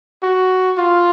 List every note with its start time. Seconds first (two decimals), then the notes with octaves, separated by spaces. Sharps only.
0.23 F#4
0.78 F4